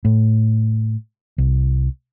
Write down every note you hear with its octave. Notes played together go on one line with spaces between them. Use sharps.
A2
C2